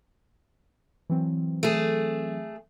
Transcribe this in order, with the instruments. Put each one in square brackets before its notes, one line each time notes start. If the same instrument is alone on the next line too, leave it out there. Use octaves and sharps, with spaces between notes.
[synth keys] E3 F#3 C4
[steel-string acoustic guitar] A3 G#4